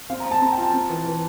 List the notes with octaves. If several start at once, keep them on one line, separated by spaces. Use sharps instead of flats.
C4 F5
A#5
C4
A5
C4 A#5
G5
F4
A5
C4
E3
E3